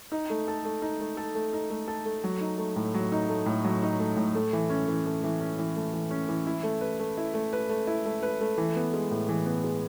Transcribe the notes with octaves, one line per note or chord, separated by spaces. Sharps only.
D#4
A3
A4
A3
D#4
A3
A4
A3
D#4
A3
A4
A3
F#3
D#4
A3
A2
F#3
D#4
A3
A2
F#3
D#4
A3
A2
A3
E3
C#4
E3
A3
E3
C#4
E3
A3
E3
C#4
E3
E4
A3
B4
A3
E4
A3
B4
A3
E4
A3
B4
A3
E3
B3
G#3
A2
E3
B3
G#3